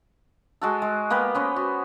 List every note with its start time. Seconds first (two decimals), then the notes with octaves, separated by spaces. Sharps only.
0.61 G#3 F#4 A4
0.82 G#3
1.10 A#3 B3 G4 B4
1.35 B3 C#4 C5
1.56 F#4